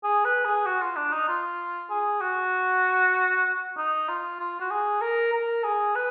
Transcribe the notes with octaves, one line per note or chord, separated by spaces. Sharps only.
G#4
B4
G#4
F#4
F4
D4
D#4
F4
G#4
F#4
D#4
F4
F4
F#4
G#4
A#4
A#4
G#4
B4